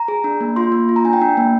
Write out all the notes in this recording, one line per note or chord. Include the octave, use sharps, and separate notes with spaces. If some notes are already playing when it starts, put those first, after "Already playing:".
Already playing: A#5
G#4
D4
A#3
F4 C6
A#3
F4
A#5
D4 G#5
G5
D4
A#3